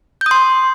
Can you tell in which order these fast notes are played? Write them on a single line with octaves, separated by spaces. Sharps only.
G6 D#6 C6